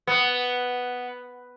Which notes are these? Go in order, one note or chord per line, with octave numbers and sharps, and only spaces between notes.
B3